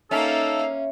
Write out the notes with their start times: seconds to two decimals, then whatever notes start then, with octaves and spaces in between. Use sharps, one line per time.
0.11 A#3 C#4 D#4 A4 E5 F5